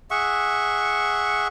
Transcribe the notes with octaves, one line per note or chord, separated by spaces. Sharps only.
G#4 E5 F#5 C#6